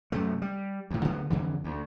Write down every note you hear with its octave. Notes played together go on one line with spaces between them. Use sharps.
F#2 C3 A3
G3
D2 A2
D1 D3 B3
F2 D3 E3
D2